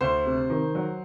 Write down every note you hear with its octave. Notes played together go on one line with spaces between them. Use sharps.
D2 C5
C3
D#3
F#3